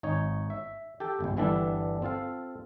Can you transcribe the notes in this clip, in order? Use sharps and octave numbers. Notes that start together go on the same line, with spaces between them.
G#1 D#4 C#5
E5
G4 A4 G5
G1 C#2
G1 G2 E3 G3 D4 A4
C4 F4 A4 F5